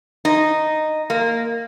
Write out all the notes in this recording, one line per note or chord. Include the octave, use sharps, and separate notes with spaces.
D#4
A#3